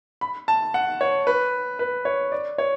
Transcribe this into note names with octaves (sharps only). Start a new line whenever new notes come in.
B5
A5
F#5
C#5
B4
B4
C#5
D5
C#5